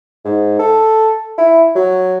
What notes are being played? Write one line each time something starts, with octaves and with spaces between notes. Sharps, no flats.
G#2
A4
E4
F#3